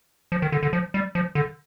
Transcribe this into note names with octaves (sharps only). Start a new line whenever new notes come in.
F3
D#3
D3
D3
F3
G3
F3
D3